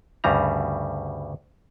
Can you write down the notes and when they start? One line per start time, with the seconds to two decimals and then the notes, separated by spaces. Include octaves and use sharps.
0.24 D2 G2 C#3 G3 A#5